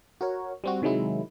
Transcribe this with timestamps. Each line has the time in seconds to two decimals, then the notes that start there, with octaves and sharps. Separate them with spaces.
0.21 F#4 A#4 C#5
0.64 G3 C4 F#4
0.82 C3 D#3 F#3 G#3 E4